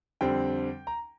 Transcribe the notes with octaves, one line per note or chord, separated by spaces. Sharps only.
F2 D3 G3 C4 G5
A#5